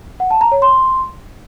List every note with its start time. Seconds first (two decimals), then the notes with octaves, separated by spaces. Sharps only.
0.20 F#5
0.31 A5
0.41 A#5
0.52 C#5
0.62 C6